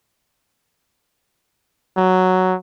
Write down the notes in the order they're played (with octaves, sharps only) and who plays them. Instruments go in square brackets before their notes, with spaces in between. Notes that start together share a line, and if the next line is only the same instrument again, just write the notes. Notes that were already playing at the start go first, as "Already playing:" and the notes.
[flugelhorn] F#3